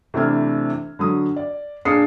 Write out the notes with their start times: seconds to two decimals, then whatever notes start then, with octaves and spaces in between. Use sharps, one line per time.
0.14 C3 E3 A3 D4 F6 G#6
0.99 D3 F#3 D#6
1.36 D5
1.85 A#2 D4 G#4 D#6 C7 C#7